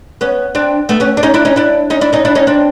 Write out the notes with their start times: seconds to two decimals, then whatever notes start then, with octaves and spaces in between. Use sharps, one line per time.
0.21 B3 C#4
0.55 C4 D4
0.89 A3 B3
1.00 B3 C#4
1.17 D4
1.23 C#4 D#4
1.34 D4 E4
1.45 C#4 D#4
1.56 D4 E4
1.90 C#4 D#4
2.01 D4 E4
2.13 C#4 D#4
2.25 D4 E4
2.35 C#4 D#4
2.47 C4 D4